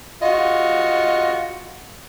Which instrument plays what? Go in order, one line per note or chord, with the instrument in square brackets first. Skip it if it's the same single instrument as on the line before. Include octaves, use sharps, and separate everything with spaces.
[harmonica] F4 F#4 [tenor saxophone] D#5